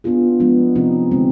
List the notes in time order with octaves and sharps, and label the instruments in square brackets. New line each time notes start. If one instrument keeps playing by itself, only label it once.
[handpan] B3 D4 F4 G#4
F3 G#3 B3 D4
C3 F3 C4 D#4
D3 G#3 C4